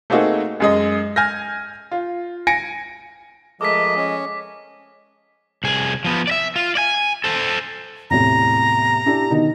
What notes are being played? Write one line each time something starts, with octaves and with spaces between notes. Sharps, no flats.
A3 A#3 C4 D#4 F#4 G#4
F#2 G#3 D#5
G#5 F6 G6 A#6
F4
G#5 A#6 C#7 D7
F3 G#3 A3 A4 A#4 D#5 D6 B6
C#4
C2 G#4
F3 B3
D5 E5
F4
D5 G#5
A4 C5
E2 A2 C3 A#5
D4 E4 G4
B2 D#3 D#4